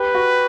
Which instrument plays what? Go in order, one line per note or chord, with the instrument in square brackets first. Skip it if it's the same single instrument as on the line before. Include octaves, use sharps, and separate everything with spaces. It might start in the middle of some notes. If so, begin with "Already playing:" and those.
Already playing: [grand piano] G4 [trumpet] B4
[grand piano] F#4